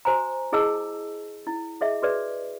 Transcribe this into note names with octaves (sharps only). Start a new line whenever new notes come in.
F#4 C5 G#5 A#5
E4 G#4 D#5 A5 E6
E4
G#4 D#5 E5
F#4 G#4 B4 D5 E5